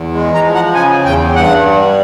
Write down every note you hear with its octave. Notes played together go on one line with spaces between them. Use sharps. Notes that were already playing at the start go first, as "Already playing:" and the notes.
Already playing: E2
G#3
A#5
F3
F#5
C#3 G#5
E2 G5
G2 F#5
G3